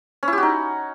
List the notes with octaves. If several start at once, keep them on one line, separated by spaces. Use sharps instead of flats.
C#4
E4
G4
F#4
D#4